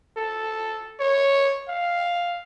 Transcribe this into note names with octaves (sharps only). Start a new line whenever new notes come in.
A4
C#5
F5